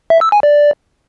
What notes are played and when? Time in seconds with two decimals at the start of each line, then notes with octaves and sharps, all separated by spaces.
0.10 E5
0.21 E6
0.32 G#5
0.43 D5